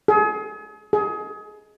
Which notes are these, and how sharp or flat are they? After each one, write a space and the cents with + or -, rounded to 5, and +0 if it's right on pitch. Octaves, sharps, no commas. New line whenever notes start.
G#4 +35
G#4 +25